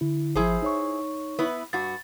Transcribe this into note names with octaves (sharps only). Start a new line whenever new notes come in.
D3 E4
G#1 F3 E4 G#4 C5
D#4 C#5 C#6
B3 E4 B4
G2 F#4 A6